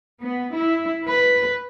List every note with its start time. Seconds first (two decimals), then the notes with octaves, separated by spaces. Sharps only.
0.20 B3
0.54 E4
1.06 B4